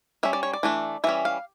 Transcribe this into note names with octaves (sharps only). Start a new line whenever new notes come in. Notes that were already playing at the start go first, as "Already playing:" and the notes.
G3 C#4 E5
D5
C#5
D5
E3 A3 D4
E3 G3 C#4 E5
F5